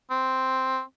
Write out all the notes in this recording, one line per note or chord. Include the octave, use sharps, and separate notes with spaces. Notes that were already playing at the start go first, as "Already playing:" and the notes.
C4